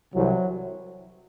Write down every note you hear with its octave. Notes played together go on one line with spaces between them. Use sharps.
C2 C3 E3 F#3